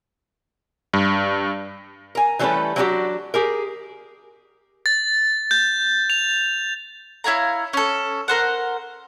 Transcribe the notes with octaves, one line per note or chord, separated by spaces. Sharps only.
G2
A#4 G#5
E3 G3 A3 C#4 A4 B4
F#3 G#3 C#4 D4 F#4 G4
G4 G#4 A#4
A6
G6
F7
E4 C#5 F5 A#5
C#4 A4
A#4 C5 F#5